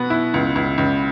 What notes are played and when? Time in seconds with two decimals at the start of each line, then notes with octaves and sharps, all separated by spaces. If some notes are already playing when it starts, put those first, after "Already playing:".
Already playing: B2 B3 F#6
0.10 E4
0.34 C#2
0.55 C#2
0.78 C#2